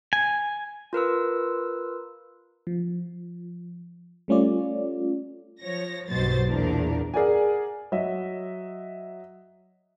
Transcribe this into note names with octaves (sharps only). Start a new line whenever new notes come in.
G#5
F4 A#4 B4 E6
F3
G3 A3 C#4 F4 D5
F3 C#5 A#6
B1 G2 B2 F#3 C5 A6
E2 A#2 D4 A#4
G#4 A#4 D5 F#5 G#5
F#3 D#5 E5